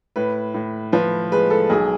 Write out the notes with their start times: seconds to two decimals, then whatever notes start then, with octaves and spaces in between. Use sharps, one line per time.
0.16 A2 B4
0.54 A2
0.92 F3 B4
1.32 G#3 B4
1.50 A4
1.70 B1 G#4